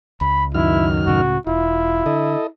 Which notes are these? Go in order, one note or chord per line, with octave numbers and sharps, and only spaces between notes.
C#2 B5
F#2 D#3 E4 F6
C#2 A2 C#3 F#4
E1 E4 F4
D3 A4 D#5